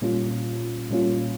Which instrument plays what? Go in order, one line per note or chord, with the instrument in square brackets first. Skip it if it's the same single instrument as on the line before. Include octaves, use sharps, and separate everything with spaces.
[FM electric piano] A#2 G3 A#3 C#4 F4
A#2 G3 A#3 C#4 F4